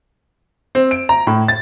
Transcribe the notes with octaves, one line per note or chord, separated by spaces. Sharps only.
C4
D7
A#5
A2
A6